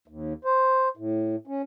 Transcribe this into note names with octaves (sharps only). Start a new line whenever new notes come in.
D#2
C5
A2
C#4